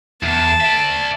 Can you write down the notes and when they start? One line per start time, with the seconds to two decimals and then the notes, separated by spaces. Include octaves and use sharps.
0.23 E2 A5
0.60 D5 E5